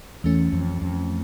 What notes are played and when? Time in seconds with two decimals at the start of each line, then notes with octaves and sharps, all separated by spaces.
0.24 E2 E3 A3 C#4
0.52 F2
0.82 F2